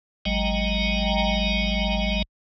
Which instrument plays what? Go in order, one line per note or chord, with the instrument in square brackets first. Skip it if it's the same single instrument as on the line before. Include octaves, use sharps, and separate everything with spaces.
[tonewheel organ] G#1 F#3 G#3 D#5 G5 A#5